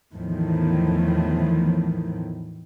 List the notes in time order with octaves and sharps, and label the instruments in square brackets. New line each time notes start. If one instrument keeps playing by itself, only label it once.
[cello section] E2 A2 D#3 F3